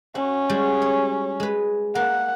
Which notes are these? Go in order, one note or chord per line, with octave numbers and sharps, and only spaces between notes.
C#4 F#4
G3 G#3 F#4
C#5
G#3 B4
A#3 F#5